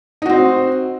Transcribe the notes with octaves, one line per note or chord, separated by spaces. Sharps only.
C4 D#4 F#4